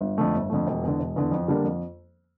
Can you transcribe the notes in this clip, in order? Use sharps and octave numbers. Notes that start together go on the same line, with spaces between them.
G1
F2 D3 A3
G1
F2 D3 A3
E1
E2 D3
E1
E2 D3
F2
D3 G3 A#3 D4
F2